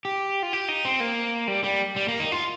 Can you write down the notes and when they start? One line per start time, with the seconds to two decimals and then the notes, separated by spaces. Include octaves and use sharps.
0.05 G4
0.43 F4
0.53 G4
0.68 D#4
0.85 C4
1.00 A#3
1.48 G3
1.64 G3
1.96 G3
2.08 A#3
2.20 D#4
2.32 F4